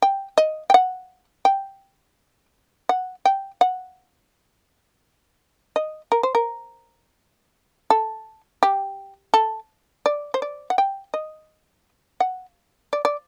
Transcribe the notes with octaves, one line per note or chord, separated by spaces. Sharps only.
G5
D#5
G5
F#5
G5
F#5
G5
F#5
D#5
A#4
C5
A#4
A4
G4
A4
D5
C5
D5
F#5
G5
D#5
F#5
D5
D5